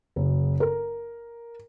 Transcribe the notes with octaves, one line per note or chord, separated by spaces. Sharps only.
F#1
A#4